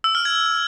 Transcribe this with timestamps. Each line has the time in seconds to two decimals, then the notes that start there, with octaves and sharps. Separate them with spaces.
0.04 E6
0.15 F6
0.25 G#6